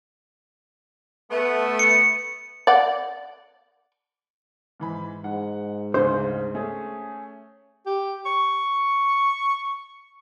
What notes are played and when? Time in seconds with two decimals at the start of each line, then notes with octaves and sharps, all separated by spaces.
1.31 A3 B3
1.79 C#7
2.67 D5 F#5
4.80 G#2 E3 B5
5.24 G#2 F#5
5.94 D2 C#3 C5
6.55 A3 C#4 G#4
7.86 G4
8.26 C#6